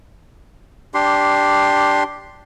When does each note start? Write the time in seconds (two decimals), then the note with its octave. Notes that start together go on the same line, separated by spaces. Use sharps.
0.94 D4 G4 C6